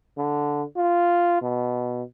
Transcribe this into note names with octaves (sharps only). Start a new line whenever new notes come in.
D3
F4
B2